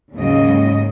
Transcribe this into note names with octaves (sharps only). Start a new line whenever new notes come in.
D#2 G#2 C#3 F#3 D#5